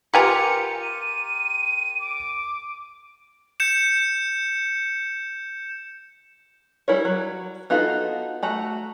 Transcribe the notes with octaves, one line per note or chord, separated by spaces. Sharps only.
F4 G4 A#4 B4 G#5 A#5 C#7
D#7
D6
G6 C#7 E7
G3 E4 A#4 C#5
F#3
B3 D#4 F4 F#4 A4
A3 F#4 A#5